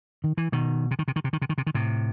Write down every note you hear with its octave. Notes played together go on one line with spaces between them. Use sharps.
D#3
E3
B2 D#3
C3
D#3
C3
D#3
C3
D#3
C3
D#3
C3
D#3
A2 C3